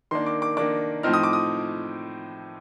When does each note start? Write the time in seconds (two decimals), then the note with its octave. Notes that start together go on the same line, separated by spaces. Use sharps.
0.11 D#3 A#3 D4 C6
0.26 D6
0.42 D6
0.57 D#3 A#3 D4 D6
1.03 A2 F3 C4 D#4 F6
1.14 D#6
1.23 D6
1.33 D#6